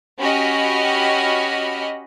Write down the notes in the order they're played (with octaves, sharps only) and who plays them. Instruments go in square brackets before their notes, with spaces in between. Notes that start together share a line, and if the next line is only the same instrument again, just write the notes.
[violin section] C#4 F#4 G4 D#5 B5 F6